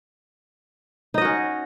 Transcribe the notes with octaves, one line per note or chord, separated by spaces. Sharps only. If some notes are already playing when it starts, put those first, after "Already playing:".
C#4 D#4 F#4 D#5